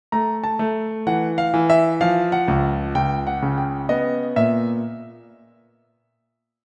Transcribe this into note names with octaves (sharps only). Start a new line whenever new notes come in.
A3 A#5
A5
A3
E3 F#5
F5
E3
E5
F3 F5
F#5
C#2
C#2 G5
F#5
C#3
G5
B3 D#5
A#2 E5